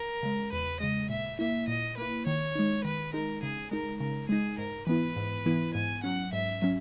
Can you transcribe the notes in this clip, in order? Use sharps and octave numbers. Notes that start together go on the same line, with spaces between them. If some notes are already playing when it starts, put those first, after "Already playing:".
Already playing: A#4
C#3 G#3
E2 B4
C#3 G#3 D#5
A#2 E5
A#3 E4 E5
A#2 D#5
A#3 E4 B4
D#3 C#5
G#3 D#4
D#3 B4
G#3 D#4 A#4
C#3 G#4
G#3 D#4 A#4
C#3 A#4
G#3 D#4 G#4
G#2 A#4
E3 B3 E4 B4
G#2
E3 B3 E4
G#2 G#5
F#3 C#4 F#5
G#2 E5
F#3 C#4